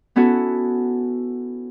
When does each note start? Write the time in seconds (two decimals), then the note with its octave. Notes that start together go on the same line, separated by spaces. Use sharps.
0.16 B3 C#4 E4 F#4 A4